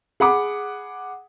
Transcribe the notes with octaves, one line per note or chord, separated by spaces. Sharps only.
G#4 F#5 B5 D6